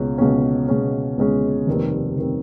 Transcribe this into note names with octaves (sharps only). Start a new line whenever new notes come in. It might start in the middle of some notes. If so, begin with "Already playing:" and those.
Already playing: C#2 B2 G#3 C#4
C#2 B2 G#3 C#4
C#2 B2 G#3 C#4
C#2 B2 G#3 C#4
F1 D#2 D#3 G3 C4
F1 D#3 G3 C4